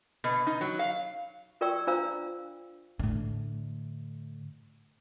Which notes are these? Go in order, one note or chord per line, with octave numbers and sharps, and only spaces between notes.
B2
D#4
F#3
F5
F4 A#4 D5 G5 C#6 E6
D4 F4 C5 F5 A#5 E6
A2 D3